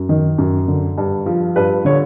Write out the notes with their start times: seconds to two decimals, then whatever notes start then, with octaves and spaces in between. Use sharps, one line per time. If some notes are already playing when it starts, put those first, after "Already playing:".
Already playing: F#2
0.09 D#3
0.38 F#2
0.68 D3
0.97 G2
1.26 F3
1.56 G2 B4
1.85 D3 C#5